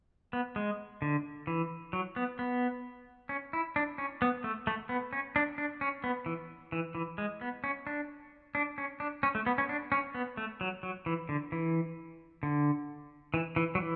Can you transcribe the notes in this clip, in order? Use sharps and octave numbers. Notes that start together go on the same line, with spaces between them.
B3
G#3
D3
E3
F#3
B3
B3
C#4
E4
D4
C#4
B3
A3
A3
B3
C#4
D4
D4
C#4
B3
E3
E3
E3
G#3
B3
C#4
D4
D4
C#4
D4
C#4
A3
B3
C#4
D4
C#4
B3
A3
F#3
F#3
E3
D3
E3
D3
E3
E3
F#3
E3